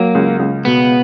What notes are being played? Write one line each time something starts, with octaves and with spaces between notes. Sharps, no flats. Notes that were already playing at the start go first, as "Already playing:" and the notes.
Already playing: F#3 A#3
C#2
C#2
B2 B3